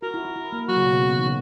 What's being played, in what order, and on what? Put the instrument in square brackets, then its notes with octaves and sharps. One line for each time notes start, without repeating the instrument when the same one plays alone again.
[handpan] F#4 [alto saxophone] A#4
[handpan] E4
E4
E4
A#3
[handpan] F#3 [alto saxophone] F#4
[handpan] C#3
B2
C#3
B2
C#3
D#3
C#3